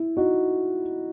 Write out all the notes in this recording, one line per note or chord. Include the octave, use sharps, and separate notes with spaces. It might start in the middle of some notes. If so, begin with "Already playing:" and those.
Already playing: E4
D#4 F#4